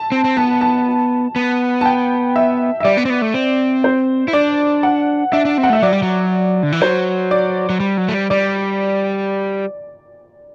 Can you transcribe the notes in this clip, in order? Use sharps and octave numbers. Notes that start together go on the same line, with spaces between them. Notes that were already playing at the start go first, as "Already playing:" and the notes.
Already playing: A5
C4
C4
B3 A5
A5
B3
A5
G5
E5
E5
G3 D5
B3
C4
B3
A3
C4
C5
E4
D4 D5
F#5
D4 E5
D4
C4
F#5
A3 E5
F#3 D5
G3
F#3
D3
E3
F#3 C5
D5
F#3
G3
F#3
A3
G3
G3 D5